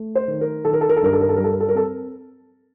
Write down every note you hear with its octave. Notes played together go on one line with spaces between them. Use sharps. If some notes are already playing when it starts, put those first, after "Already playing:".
Already playing: A3
C5
D#3
A#4
D#3 A4
A#4
A4
A#4
A4
G2 A#4
A4
A#4
A4
G3 A#4
A4
A#4
A4
A#4
C4 A4